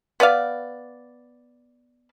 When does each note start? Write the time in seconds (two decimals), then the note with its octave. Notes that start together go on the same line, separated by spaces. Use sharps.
0.20 B3 B4 D5 F5